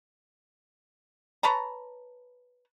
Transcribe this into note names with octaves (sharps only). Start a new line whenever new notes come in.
B4 C#5 A5 A#5